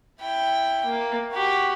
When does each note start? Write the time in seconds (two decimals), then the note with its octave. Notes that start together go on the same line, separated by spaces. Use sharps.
0.20 E4 G5
0.84 A#3
1.33 F#4 G4